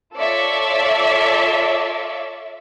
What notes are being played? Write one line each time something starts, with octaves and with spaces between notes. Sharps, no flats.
F4 A4 C#5 D5 E5